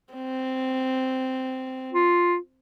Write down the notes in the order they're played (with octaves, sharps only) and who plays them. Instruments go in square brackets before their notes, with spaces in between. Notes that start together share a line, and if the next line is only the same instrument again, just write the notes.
[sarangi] C4
[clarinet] F4